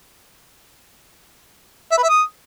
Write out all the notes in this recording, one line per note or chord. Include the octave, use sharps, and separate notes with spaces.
E5
B4
E5
D#6